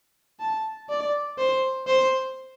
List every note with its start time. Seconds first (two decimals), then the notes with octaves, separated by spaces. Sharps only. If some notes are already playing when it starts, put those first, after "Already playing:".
0.40 A5
0.89 D5
1.38 C5
1.87 C5